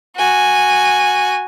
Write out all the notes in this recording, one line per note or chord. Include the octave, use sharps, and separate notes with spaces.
F#4 G#5